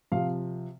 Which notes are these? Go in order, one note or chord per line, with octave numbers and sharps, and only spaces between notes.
C3 F3 F5